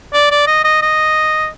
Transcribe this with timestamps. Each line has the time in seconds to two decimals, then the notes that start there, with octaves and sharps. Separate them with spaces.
0.13 D5
0.31 D5
0.47 D#5
0.65 D#5
0.82 D#5